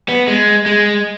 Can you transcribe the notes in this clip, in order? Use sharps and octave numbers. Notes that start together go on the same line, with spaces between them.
B3
G#3
G#3